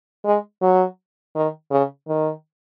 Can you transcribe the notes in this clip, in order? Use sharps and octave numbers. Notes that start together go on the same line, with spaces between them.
G#3
F#3
D#3
C#3
D#3